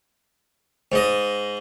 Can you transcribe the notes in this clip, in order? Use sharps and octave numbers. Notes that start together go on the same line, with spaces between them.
G#2 D#5